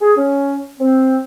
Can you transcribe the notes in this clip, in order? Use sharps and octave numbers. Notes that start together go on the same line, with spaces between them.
G#4
C#4
C4